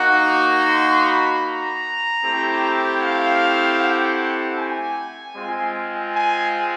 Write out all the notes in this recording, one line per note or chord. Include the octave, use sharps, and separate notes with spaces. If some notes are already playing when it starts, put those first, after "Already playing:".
Already playing: A#3 D#4 F#4 F#5
C6
B5
A#5
A3 C4 E4 G4
F5
F#5
G#5
G#3 C4 F4
G#5